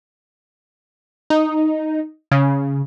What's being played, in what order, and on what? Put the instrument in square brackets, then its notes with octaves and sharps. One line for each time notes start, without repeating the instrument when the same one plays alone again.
[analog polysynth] D#4
C#3